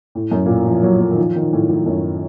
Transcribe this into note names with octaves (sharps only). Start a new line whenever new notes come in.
A2
F#2
A#2
A2
F3
F#3
F#3
D#3
F3
D#3
A2
A2
F#2